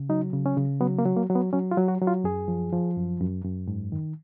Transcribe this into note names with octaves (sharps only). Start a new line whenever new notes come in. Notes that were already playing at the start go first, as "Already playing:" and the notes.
Already playing: C#3
F#3 D#4
C#3
C#4
C#3
F#3 B3
A#3
F#3
A#3
F#3
B3
F#3 C#4
F4
F#3
F#4
F#3
F4
F#2 G#4
F3
F3
F#2
F#2
F#2
G#2
D#3